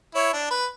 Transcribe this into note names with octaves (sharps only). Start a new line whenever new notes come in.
E4 C#5
D4
B4